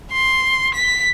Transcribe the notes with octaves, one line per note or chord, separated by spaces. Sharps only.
C6
B6